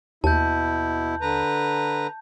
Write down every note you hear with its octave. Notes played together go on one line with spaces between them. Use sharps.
D#2 B2 E4 A5 G6
D3 B4 A#5